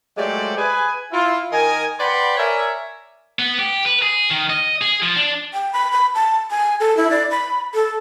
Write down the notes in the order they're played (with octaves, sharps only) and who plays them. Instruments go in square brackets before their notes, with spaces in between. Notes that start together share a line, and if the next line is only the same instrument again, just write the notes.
[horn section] F#3 G#3 A3 G4 C5 D5
G#4 B4 G#5
E4 F4
D#3 A#4 D#5 G#5
B4 D5 F#5 G5 B5 C6
A#4 C#5 D5 E5 G#5
[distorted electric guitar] B3
G4
B4
G#4
D#3
D#5
G#4
F3
D4
[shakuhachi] G5
B5
B5
A5
G#5
A4
E4
D5
B5
A4